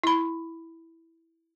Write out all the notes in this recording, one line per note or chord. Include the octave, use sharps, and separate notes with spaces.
E4 B5